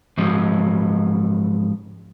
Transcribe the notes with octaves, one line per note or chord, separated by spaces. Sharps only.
G#2 F3 F#3